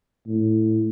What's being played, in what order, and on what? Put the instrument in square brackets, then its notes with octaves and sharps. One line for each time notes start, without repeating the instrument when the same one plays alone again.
[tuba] A2